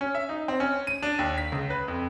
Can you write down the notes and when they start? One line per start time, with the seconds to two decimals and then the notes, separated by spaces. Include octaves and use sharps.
0.01 C#4
0.15 E5
0.29 D#4
0.48 C4
0.60 C#4
0.87 D#7
1.03 D4
1.19 D#2
1.38 B6
1.52 C#2
1.70 B4
1.88 F2